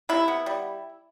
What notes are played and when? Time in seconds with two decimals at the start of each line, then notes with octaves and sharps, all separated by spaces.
0.09 C3 E4
0.28 B3
0.46 G3